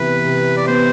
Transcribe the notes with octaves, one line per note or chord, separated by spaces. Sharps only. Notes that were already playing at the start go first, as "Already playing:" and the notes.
Already playing: C3 E3 B3 B4
C3
D5
B3 C5